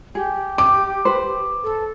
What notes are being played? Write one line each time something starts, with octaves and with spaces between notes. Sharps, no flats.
G4 G#4
D6
B4 C5
A4